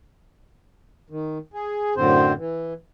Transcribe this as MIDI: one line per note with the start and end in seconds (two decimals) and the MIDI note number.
1.10 1.38 51
1.54 1.94 68
1.96 2.33 42
1.96 2.33 45
1.96 2.33 50
1.96 2.33 60
1.96 2.33 72
2.37 2.73 52